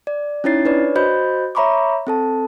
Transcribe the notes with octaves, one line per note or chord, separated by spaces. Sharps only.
D5
C#4 D#4 E4 C#5 A6 C7
D4 B4 C#5 D5
F#4 C5 D#5 B5 G6
C#5 E5 A#5 B5 C#6 D6
C4 A4 A5